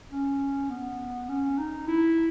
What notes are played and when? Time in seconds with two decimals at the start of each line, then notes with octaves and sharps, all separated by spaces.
0.11 C#4
0.69 B3
1.29 C#4
1.58 D#4
1.88 E4